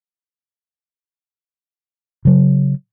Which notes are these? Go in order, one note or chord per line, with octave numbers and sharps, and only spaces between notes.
C#3 F#3